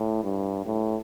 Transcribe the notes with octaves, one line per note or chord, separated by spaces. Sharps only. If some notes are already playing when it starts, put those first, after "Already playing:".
Already playing: A2
G2
A2